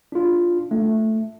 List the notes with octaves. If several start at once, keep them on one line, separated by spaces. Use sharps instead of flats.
D4 F4
A3